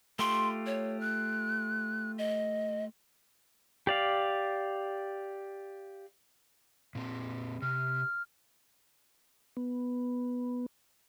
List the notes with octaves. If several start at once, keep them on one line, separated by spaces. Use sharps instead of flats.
A3 F4 G4 C6
C#5
F#6
D#5
G4 D5 F5
A#2 C4
C3 F6
B3